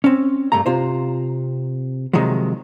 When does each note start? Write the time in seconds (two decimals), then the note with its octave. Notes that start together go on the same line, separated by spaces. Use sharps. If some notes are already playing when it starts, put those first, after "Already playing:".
0.04 C4 C#4
0.52 G2 A3 A#3 A#5
0.66 C3 F4 C5
2.13 C3 D#3 F3 F#3 G#3